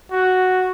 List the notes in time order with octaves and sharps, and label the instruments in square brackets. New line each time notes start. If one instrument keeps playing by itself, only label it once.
[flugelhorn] F#4